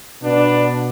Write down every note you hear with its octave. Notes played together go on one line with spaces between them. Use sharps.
B2 B3 D4